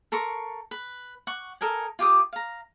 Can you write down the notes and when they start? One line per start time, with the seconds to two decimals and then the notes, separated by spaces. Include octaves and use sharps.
0.12 A4 A#4 C6 C#6
0.71 B4
1.27 F#5 C#6
1.61 A4 A#4 D#5 G#5
1.99 F4 G4 D6 D#6
2.33 F5 A#5